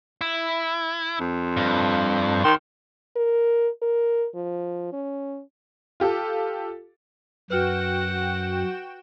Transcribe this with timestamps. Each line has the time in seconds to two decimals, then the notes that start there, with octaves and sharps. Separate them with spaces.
0.21 E4
1.21 F2
1.57 G2
2.44 D#3 C6
3.16 A#4
3.82 A#4
4.35 F3
4.93 C#4
6.00 F4 G4 A4
7.50 F#2 F#4 B4 F#5 G5 F6 E7